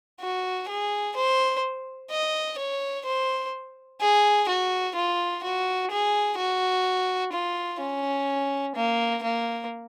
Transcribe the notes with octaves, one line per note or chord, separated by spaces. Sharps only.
F#4
G#4
C5
D#5
C#5
C5
G#4
F#4
F4
F#4
G#4
F#4
F4
C#4
A#3
A#3